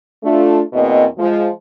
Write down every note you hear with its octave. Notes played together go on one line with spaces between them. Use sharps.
A3 D4 F4
E2 B2 A#3 C4 D#5
F3 G#3